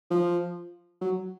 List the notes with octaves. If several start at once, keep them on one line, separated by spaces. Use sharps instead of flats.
F3
F#3